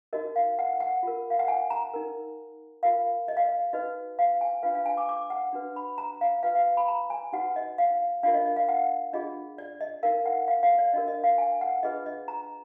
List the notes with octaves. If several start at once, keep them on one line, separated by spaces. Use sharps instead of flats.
D#4 F#4 A#4 D#5
F5
F#5
F#5
F4 A#4
F5
F#5
G#5
A#5
D#4 A#4
F4 A#4 F5
D#5
F5
D#5
D#4 F#4 B4 D#5
F5
G#5
D4 F4 B4 F5
F5
G#5
D6
D6
F#5
D4 F#4 B4
B5
A#5
F5
F4 B4 F5
F5
B5
A#5
G#5
D#4 F#4 B4 F#5
D#5
F5
D4 F4 A#4 F5
D#5
D#5
F5
F#5
D4 F4 G#4 D#5
D5
D#5
D#4 A#4 F5
F#5
F5
F5
D5
D4 F#4 A#4 D#5
D#5
F5
G#5
F#5
D4 F4 G#4 B4 D#5
D#5
A#5